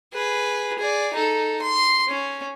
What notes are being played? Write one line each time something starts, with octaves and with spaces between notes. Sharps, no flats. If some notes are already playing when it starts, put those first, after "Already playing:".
G#4 B4
G#4 D5
D#4 A4
C6
C#4